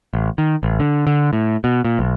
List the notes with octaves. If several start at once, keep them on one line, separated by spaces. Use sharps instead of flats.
A1
D#3
A1
D3
D3
A2
B2
A#2
B1